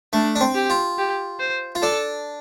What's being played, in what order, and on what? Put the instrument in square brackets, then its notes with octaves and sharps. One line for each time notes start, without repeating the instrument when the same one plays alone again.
[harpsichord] A3 [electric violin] D4
[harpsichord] D4
C4
[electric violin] G4
[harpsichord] F4
[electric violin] G4
C5
[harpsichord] F4
[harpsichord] D4 [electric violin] A4